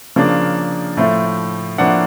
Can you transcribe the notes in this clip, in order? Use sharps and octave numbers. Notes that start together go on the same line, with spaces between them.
C#3 F3 A#3 D4
A2 F3 A3
A2 F3 A#3 D4 F#5